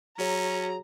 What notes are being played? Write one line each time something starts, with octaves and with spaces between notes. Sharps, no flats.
F#3 C#4 F#4 G#4 C#5 A#5